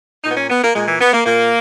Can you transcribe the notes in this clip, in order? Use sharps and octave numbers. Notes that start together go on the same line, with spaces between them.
A#2 D#4
B3
C#4
B3
A#3
A#2 G#3
E3
B3
A#3
A#2 A#3